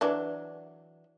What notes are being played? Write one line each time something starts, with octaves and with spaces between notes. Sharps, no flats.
E3 F#3 D4